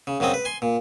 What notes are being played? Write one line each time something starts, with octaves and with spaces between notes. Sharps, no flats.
C#3
F#2 C#3 F#3 C4 D#5
B4
G#5 C6
A#2